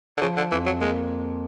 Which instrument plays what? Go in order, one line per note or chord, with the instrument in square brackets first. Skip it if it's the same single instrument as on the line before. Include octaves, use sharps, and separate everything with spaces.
[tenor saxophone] D3
[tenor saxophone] C#3 [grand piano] F3
[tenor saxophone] D3
[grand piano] F2 [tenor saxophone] E3
[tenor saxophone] F#3
[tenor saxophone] G#3 [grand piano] A#3